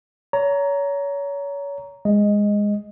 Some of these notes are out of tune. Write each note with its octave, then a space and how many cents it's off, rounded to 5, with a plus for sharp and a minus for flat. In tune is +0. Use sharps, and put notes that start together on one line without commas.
C#5 +30 A#5 +0
G#3 -10 D#5 +0